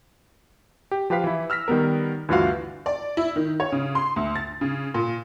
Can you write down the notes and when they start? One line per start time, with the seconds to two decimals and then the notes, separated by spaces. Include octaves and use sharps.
0.91 G4
1.10 F3 G4 B4 F5 B6
1.24 E3 E4
1.50 E6 F6 A#6 B6
1.68 D#3 G3 B3 A#4
2.29 D2 G2 E3 F4 F#4 F5
2.86 D5
3.17 E4
3.36 D#3
3.60 C#5
3.72 C#3
3.95 C6
4.16 D2
4.35 A6
4.61 C#3
4.94 A#2